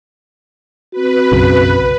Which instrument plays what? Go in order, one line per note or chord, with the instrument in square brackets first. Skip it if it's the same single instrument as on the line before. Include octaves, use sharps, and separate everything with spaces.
[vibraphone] C4 F#4 [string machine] B4
[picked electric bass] B1 F#2 C#3